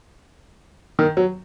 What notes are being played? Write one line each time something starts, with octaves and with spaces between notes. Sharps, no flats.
D#3
F#3